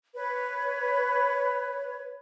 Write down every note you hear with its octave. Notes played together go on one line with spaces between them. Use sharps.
B4 C#5